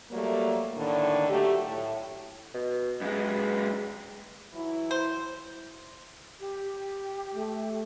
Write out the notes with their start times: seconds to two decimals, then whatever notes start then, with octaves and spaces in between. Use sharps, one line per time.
0.12 F#3 G3 A3 A#3
0.76 A2 D3 D#3 A#3 D4
1.29 F#3 A3 F#4 G4
1.66 A2
2.54 B2
3.02 F#2 G#3 B4
4.53 E3 F#3 E4
4.91 C5
6.40 G4
7.35 A3